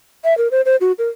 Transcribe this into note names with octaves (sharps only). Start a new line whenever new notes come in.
E5
A#4
C5
C5
F#4
A#4